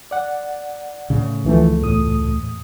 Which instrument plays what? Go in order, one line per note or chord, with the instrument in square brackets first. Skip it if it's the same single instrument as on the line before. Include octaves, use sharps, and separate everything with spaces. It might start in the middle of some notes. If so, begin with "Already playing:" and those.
[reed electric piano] D5 F#5
[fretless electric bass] A2 C#3
[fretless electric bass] C#2 A3 [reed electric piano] D3 E3 F3
[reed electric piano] E2 A2 D#6